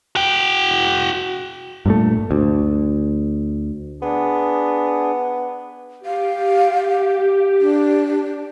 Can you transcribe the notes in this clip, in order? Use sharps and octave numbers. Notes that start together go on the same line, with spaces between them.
F#4 G5
G2 A#2 A3
D2
B3 D4 G#4
G4 F5
D4